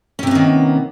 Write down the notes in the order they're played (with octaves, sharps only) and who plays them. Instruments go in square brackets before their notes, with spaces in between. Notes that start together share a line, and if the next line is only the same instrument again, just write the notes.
[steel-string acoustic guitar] C#4
C3
B3
A#3
D#3